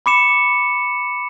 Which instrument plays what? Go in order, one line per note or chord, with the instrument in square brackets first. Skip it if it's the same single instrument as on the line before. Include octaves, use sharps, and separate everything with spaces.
[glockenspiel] B5 D6 C#7 E7